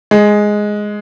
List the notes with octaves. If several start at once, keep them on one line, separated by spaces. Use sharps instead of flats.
G#3